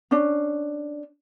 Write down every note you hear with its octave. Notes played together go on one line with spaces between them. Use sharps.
C#4 D4